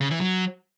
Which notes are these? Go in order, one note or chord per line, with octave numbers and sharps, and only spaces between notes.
C#3
E3
F#3